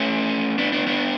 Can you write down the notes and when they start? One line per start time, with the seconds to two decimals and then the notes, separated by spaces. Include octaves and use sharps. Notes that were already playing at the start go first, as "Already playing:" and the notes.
Already playing: A3 C#4
0.58 B3 D4
0.73 B3 D4
0.87 B3 D4